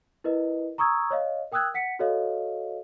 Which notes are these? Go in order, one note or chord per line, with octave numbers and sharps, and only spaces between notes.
E4 A#4 B4 D#5
A#5 C#6 D#6 E6 G#6
C#5 D#5 F5
A#4 G5 D#6 E6 F#6 G#6
F#5 B6 C#7
F#4 A4 C#5 D#5 F5